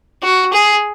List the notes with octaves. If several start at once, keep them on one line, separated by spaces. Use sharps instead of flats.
F#4
G#4